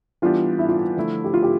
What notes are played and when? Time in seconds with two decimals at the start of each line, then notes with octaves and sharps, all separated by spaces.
0.22 E3 G3 B3 D4 F4 G4
0.59 E4
0.68 F4
0.97 D3 F3 A3 E4
1.24 G4
1.34 F4
1.42 G4